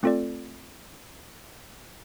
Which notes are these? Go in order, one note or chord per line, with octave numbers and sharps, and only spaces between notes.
A3 C4 F4 A4 D5